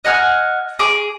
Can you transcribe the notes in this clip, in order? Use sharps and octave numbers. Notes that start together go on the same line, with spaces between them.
D#5 F#5 G#5 F6
G#4 D6